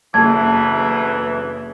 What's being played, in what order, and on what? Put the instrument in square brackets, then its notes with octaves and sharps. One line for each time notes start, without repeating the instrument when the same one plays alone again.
[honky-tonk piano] F#1 G#4 [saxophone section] D2 B2 E3 [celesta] A5 [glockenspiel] G#6